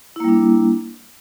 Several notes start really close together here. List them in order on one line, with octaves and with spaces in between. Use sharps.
E4 A#3 G3 D4